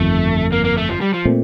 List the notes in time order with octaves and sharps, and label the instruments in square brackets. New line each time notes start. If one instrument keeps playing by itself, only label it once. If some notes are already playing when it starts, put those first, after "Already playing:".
Already playing: [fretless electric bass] G1 F2 D#3 [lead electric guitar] A3
[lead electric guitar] A#3
A#3
A3
F3
G3
F3
[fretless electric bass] A#2 A3 C4